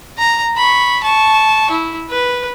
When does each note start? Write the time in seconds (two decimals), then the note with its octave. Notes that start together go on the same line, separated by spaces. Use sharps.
0.18 A#5
0.57 B5 C#6
1.04 A5 C#6
1.71 E4
2.10 B4